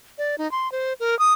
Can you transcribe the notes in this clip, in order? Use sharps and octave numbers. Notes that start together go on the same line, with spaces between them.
D5
D#4
C6
C5
A#4
D#6